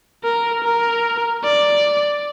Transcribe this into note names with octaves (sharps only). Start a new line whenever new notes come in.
A#4
A#4
D5